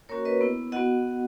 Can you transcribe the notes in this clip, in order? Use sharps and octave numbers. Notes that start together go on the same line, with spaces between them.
A#3 C#4 F#4 A#4 C#5
B4 D#5
B3 E4
B3 F#4 D#5 F#5